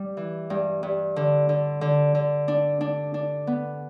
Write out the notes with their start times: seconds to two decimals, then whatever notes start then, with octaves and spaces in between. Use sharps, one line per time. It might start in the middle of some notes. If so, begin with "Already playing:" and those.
Already playing: G3
0.17 E3
0.50 G2
0.83 G2
1.16 D3
1.49 D3
1.81 D3
2.15 D3
2.48 D4
2.81 D4
3.14 D4
3.47 B3